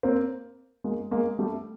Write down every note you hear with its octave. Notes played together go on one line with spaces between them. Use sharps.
A#3 C4
G#3 A#3
G#3 A#3
G3 A3